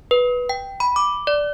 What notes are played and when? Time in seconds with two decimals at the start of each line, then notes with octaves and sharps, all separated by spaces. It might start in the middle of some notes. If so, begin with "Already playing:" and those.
0.11 B4
0.49 G5
0.80 B5
0.96 D6
1.27 D5